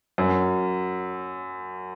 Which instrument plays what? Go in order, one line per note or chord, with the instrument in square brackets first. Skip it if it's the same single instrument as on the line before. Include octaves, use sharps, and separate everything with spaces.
[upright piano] F#2